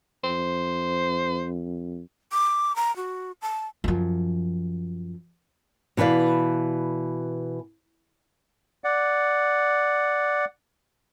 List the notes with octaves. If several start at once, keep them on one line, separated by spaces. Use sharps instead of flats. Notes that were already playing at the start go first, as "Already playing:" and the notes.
F2 C5
D6
A#5
F#4
A5
F#2 F3
B2 E3 B4 D5 F5
D5 F#5